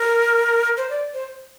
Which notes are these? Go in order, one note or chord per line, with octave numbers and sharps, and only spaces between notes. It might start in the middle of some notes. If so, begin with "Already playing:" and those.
Already playing: A#4
C5
D5
C5